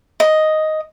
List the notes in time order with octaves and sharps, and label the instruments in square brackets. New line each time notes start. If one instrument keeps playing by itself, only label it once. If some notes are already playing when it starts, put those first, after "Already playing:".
[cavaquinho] D#5